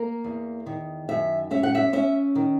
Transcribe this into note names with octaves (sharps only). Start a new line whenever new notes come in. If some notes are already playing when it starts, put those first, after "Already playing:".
Already playing: A#3 A#4
E2
D#3
F#2 E5
C#4 E5
F#5
E5
C#4 E5
D#3